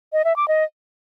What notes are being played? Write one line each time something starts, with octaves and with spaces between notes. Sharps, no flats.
D#5
E5
D6
D#5